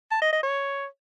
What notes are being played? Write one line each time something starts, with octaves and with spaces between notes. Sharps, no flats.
A5
D#5
D#5
C#5